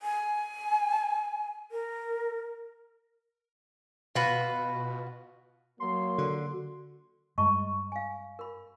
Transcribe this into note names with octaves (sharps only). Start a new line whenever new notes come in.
G#5
A#4
B2 F4 F#4 B4
F#3 A#3 C6
D3 F#4
G2 G#3 D#5 A5 C#6
F5 G#5
A#4 B5